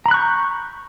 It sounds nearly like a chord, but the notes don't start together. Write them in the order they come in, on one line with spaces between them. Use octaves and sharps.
A#5 B5 F#6 C#6 G6